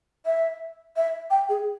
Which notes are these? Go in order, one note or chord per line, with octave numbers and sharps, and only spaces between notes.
E5
E5
G5
G#4